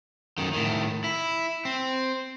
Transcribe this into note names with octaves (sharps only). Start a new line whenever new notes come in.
F#2 D#3
A2 D#3
E4
C4